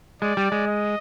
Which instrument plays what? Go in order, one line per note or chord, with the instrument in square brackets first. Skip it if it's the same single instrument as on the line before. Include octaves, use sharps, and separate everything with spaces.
[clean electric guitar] G#3 [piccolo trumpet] D5
[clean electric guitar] G3
G#3
[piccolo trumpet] D#5